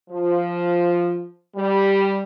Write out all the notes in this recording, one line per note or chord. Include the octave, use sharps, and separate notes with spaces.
F3
G3